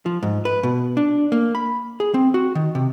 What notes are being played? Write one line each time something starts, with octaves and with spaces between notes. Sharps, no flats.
F3
G#2
B4
B2
D4
A#3
B5
G#4
C4
F#4
D#3
C3